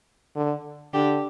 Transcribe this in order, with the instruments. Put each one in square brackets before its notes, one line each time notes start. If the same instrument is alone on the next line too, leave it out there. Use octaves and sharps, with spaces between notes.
[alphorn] D3
[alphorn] D3 [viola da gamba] D4 G4